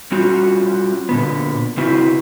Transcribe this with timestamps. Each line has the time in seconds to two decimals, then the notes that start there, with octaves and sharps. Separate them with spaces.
0.12 G3 C#4 F4 F#4
1.09 A#2 D3 B3
1.77 C#3 C4 E4 F#4 B4